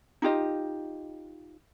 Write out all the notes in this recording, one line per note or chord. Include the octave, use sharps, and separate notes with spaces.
D#4 F4 G4 D#5